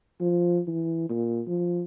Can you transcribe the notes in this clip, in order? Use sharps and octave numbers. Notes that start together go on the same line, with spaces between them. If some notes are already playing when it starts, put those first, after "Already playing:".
F3
E3
A#2
F3